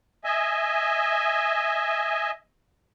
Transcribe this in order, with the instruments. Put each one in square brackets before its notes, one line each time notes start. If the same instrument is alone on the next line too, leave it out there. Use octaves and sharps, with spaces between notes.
[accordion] D#5 E5 G#5